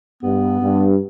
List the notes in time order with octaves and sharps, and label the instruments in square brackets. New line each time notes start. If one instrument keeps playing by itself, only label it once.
[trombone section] G2 [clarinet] B3
[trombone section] G2